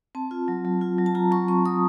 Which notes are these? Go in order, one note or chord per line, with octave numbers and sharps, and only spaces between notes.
C4 A5
F4
F#3
F#3
F4
F#3
A5
F4 A#5
F#3 C#6
C4 C#6
F#3 D#6